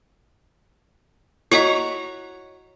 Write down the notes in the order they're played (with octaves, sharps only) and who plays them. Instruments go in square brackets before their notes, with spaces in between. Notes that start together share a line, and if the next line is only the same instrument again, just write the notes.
[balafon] E4 F#4 D#5 [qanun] C#5 F#5 A#5